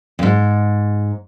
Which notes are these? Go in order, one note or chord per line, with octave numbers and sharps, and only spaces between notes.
F2 G#2